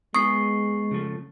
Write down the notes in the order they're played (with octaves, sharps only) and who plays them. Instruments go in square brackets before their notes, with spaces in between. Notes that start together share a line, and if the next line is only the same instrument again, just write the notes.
[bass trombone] G#3 [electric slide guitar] B3 D#4 G#4 [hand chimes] C#6 C7 [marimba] D#6
[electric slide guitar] C#3 F3 A3